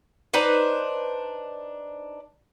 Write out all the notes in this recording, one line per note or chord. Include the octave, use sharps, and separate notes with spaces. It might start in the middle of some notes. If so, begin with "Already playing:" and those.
D4 D#4 B4 C5